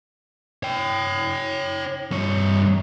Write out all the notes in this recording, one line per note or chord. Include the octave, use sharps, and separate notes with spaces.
C#5 G5
G2 C#5